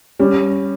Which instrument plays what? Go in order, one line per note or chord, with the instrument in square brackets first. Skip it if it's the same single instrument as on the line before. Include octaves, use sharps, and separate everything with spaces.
[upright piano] G3 [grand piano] C#4